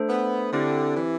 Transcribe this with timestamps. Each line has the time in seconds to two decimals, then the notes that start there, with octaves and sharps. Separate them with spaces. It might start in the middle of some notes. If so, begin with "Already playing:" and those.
Already playing: A3 D4 A4 C5
0.09 B3
0.53 D3 C4 E4 G4
0.96 E3